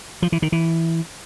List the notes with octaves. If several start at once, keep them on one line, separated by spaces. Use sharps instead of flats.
F3
E3
D#3
E3